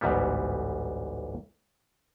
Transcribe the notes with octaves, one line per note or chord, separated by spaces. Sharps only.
A1 D2 G#2 G3 B3